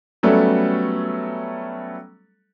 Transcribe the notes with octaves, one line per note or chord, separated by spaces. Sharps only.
F#3 G3 A3 B3 C#4 A4